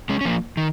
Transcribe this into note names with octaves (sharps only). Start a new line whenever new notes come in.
G#3 C#4
C#4
F3 A#3
D#3